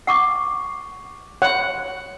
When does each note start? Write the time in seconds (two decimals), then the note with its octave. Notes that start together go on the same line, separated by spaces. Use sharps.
0.07 F#5 C#6 D6
1.42 C#5 F#5 B5